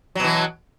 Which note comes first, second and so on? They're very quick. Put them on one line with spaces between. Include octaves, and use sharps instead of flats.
F#3 B2 E3